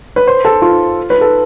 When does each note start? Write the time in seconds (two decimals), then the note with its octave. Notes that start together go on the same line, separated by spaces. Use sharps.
0.16 B4
0.27 C5
0.45 A4
0.62 F4
1.10 B4
1.21 A4